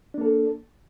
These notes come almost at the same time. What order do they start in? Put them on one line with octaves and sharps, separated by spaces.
D4 A#3 A4